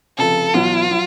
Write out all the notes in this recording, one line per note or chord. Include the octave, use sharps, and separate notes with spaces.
F1 F2 C#3 A4
E2 B2 F#3 F4
F#3